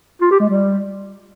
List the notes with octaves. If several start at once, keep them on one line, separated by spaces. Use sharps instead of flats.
F4
G4
G#3
G3